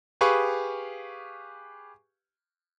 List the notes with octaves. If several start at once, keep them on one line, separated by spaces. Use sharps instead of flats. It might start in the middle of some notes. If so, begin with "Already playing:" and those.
G4 G#4 B4 F5 C#6